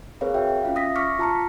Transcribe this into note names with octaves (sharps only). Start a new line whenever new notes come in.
C4 G#4 A#4 B4 C#5 F5
F#4 E5 G5
C#4 F4 F5
E5 D#6 A#6 B6
C#6 D6 F6 A#6 B6 C#7
F4 A5 A#5 F6 C#7